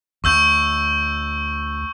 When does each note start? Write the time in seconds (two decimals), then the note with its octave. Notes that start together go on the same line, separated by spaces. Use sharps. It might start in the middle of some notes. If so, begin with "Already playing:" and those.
0.24 D2 C#6 E6 G6